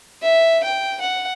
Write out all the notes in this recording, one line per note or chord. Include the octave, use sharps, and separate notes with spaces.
E5
G5
F#5